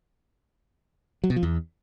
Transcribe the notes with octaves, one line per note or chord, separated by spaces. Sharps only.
F#3
B2
F3
E2